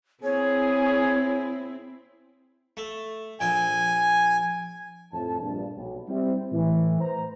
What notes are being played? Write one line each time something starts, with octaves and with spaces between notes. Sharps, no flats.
C4 E4 G#4 C#5
A3
A#1 G5 G#5
F2 A2 A5
A#1 G2
B1
G3 C4 E4 G4
A2 E3
B4 C5 A#5